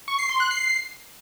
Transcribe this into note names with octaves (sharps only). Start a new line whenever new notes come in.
C#6
C7
C6
F#6
C7